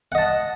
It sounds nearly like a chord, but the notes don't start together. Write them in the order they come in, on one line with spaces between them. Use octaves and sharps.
F#5 D#5 A5